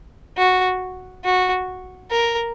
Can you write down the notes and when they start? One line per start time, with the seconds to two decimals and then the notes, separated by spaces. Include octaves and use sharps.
0.37 F#4
1.24 F#4
2.10 A#4